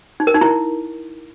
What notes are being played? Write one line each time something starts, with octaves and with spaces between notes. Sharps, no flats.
D#4
A#4
D#4
E4